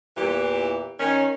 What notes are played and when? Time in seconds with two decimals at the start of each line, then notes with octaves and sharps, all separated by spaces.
0.17 E2 A#2 E3 E4 G4
0.99 D#3 C#4